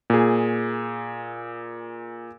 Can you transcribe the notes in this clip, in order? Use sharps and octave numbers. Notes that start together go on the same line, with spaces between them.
A#2 G#4